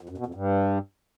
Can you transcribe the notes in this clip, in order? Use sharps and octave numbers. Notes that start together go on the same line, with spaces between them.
F2
F#2
B2
F2
G2